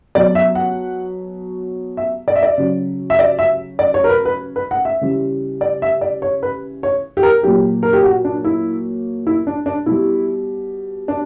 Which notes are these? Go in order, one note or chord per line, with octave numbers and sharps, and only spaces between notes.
B2 F#3 D5
E5
F#5
E5
D5
E5
D5
C#3 F#3
E5
D5
E5
D5
C#5
A#4
B4
B4
B4
F#5
E5
C#3 E3 G3
D5
E5
D5
C#5
B4
C#5
G4
A#4
A#2 F#3 G4
A#4
G4
F#4
D4
E4
E4
D4
D4
B2 G3 E4
D4